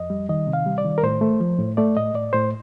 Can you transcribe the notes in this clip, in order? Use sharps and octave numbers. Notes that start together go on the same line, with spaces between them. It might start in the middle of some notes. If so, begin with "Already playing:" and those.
Already playing: F2 D#5
G3
D#3 D#5
C3
F5
G3
D5
D#3
A#4
A2 C5
A3
F3
A2
A3 D5
A2 D#5
A2 D5
A2 C5